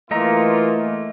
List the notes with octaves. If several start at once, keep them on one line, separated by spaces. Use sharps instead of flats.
E3 A3 A#3 F4 D#5 A#5